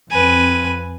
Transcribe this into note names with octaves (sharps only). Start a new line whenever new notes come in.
F2 C4 B4 G#5